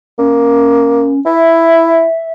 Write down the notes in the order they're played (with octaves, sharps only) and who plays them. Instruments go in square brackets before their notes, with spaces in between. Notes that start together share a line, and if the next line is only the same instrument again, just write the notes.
[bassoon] A#3 [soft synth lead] C#4
[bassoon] E4 [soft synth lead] E5